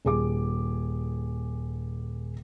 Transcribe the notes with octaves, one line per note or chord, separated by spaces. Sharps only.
D#1 G#4 D6